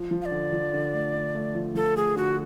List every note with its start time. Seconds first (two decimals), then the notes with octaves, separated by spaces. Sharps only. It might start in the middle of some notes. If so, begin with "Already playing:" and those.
Already playing: F3
0.11 F3
0.22 F5
0.25 D5
0.31 D3
0.53 F3
0.73 D3
0.94 A3
1.14 D3
1.35 A3
1.55 F3
1.75 F3 A4
1.95 A3 G#4
2.16 D3 F#4